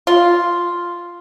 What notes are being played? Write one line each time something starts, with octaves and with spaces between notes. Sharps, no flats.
F4